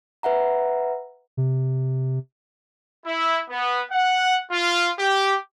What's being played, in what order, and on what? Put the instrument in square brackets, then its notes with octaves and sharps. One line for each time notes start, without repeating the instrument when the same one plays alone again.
[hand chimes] B4 E5 F#5 A#5
[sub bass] C3
[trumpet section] E4
B3
F#5
F4
G4